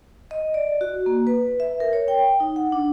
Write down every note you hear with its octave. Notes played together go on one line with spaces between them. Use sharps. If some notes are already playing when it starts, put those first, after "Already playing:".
D#5
D5
F#4
A#3
B4
E5
A#4
C#5
G5
D#4
F#5
D4